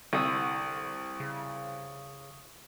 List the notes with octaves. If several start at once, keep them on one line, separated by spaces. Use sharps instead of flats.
C2 D3 C#6 D#6 E6
C#3